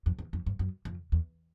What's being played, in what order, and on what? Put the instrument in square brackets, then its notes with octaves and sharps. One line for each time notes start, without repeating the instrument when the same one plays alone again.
[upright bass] F2
E2
F2
G2
F#2
F2
E2